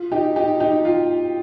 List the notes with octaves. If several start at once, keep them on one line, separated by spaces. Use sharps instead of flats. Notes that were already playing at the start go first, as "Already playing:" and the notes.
Already playing: F4
D#4 G4
D#4 G4
D#4 G4
F4